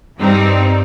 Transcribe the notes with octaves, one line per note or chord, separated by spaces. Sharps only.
G2 G3 C4 D#4